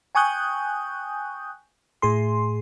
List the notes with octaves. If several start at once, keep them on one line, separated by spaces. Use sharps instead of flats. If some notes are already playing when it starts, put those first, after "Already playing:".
G5 G#5 C#6 D#6 F#6 G6
A2 G#4 C6